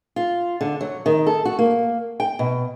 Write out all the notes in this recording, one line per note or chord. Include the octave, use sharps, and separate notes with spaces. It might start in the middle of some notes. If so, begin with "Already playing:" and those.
F4
D3
F#3
D#3
A4
F#4
A#3
G5
B2